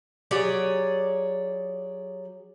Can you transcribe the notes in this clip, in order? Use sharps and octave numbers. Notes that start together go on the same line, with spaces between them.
F#3 G4 G#4 C#5 D5 G#5